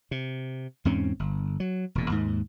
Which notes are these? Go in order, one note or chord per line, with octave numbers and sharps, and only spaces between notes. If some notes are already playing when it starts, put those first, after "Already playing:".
C3
E2 G#2 C4 C#4
G1
F#3
E1 A#2
D#2 G#2